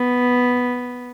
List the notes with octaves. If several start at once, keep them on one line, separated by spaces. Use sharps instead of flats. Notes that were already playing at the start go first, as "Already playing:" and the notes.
Already playing: B3